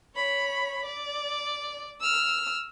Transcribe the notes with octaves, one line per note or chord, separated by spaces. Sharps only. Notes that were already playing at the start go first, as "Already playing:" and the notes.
C#5 B5
D5
E6 F6